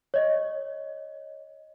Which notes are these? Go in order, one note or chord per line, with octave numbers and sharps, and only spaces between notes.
C#5 D#5